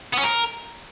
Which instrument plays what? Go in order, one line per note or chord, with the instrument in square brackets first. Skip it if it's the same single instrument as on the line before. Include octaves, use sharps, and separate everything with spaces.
[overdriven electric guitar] B3
C#4
A#4